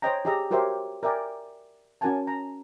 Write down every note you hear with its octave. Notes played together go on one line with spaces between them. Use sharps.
C5 C#5 D#5 G5 A#5
G4 G#4 D#5 A#5 E6
F#4 G4 A#4 C5 C#5 E5
A#4 D5 E5 G5 G#5
C#4 F#4 A#4 F#5 G#5 A5
A#5